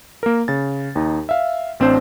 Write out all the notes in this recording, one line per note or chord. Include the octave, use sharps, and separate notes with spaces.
A#3 A#4
C#3 A6
D#2 D#4
E5 F5
A1 C4 D4 C5